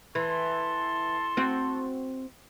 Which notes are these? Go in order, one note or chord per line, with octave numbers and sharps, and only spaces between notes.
E3 A4 A5 C6
C4 F#4